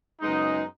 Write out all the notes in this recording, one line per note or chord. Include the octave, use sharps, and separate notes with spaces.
F#2 C#3 G#3 B3 D#4